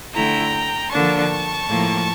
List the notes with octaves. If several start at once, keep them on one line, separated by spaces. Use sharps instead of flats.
D3 A3 E4 G5 A#5
D3 F3 A#3 D4 A5 C#6
A2 F3 A#3